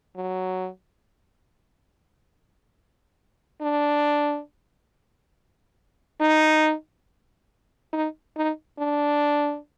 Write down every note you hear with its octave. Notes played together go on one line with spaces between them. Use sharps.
F#3
D4
D#4
D#4
D#4
D4